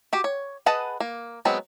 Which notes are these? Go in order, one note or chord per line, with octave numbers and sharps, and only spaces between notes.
F#4 G4
C#5
G#4 B4 D#5 F#5 A5
A#3
F#3 G#3 B3 C4